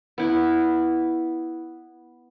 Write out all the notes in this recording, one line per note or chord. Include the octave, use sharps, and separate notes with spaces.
B3 E4